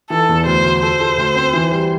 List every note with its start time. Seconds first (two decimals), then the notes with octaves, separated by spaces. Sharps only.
0.10 E3 A4
0.29 E2
0.46 D2 C5
0.65 D2
0.82 A4 C5
1.00 A4
1.18 D2
1.36 C4
1.53 E3
1.71 G3